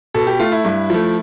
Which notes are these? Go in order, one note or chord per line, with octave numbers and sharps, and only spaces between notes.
B2 A4
G4
A3 F4
E4
G2
F3 A3